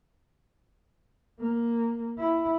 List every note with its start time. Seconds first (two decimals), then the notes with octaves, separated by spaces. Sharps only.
1.40 A#3
2.19 E4